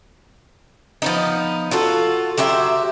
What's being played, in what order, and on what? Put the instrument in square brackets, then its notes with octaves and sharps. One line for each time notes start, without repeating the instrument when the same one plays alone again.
[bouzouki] F3 B3 D#4
F4 F#4 A4
F#3 G4 C5 E5